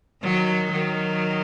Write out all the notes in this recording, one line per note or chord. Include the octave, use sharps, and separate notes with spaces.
D#3 F#3
D#3 F#3